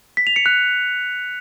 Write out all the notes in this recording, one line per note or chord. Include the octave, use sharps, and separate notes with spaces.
B6
F7
C#7
F#6